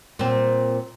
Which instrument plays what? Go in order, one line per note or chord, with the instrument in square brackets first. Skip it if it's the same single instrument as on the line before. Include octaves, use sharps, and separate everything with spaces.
[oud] A#2 C4